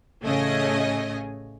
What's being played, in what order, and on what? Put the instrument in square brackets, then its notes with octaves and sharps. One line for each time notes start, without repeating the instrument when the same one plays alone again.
[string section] A1 C#3 A3 C#4 D#5 G#5